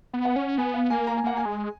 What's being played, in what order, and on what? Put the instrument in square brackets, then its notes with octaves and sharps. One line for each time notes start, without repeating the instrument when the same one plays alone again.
[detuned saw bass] B3
[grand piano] F#5
[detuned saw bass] C#4
[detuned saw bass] B3 [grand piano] G#5
[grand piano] F5
[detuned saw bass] A#3 [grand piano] G#5
[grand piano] A#5
G#5
[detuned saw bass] A#3 [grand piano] F#5
[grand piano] G#5
[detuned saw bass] G#3